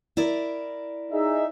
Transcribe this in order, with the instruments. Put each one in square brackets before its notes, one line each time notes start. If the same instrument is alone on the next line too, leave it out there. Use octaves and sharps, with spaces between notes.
[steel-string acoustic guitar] E4 A#4 D5
[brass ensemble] D#4 G#4 E5